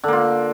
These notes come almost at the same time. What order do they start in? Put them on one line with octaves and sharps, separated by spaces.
D3 A#3 F4